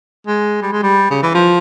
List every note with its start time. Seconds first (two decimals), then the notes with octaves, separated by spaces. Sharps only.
0.27 G#3
0.62 G3
0.73 G#3
0.83 G3
1.11 C#3
1.23 E3
1.35 F3